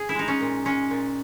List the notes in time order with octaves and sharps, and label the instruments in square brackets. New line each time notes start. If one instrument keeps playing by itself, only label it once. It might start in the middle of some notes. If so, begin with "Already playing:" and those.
Already playing: [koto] G#4
E4
G#3 D#4
C#4
A#2
G#3 C#4
A#2